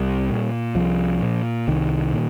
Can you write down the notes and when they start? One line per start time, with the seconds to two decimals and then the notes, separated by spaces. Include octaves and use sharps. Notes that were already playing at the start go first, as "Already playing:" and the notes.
Already playing: C2 G3
0.30 A#2
0.75 C2 F3
1.22 A#2
1.68 C2 D#3
2.13 A#2